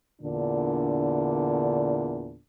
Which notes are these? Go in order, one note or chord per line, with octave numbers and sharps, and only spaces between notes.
E2 A#2 D3 D4